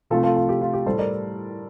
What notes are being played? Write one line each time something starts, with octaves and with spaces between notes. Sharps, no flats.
C3 F3 A3 F4 A4
F4 A4
F4
G4
F4
G4
A2 G3 A4 C5
A#4 D5